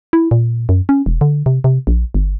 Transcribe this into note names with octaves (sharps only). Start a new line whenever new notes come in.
E4
A#2
F#2
C#4
E1
D3
C3
C3
A#1
G1